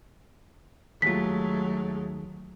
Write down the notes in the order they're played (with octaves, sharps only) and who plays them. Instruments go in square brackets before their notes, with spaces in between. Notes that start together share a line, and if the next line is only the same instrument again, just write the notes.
[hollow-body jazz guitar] D#2 F4 [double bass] F#3 [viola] G#3 A3 [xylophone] B6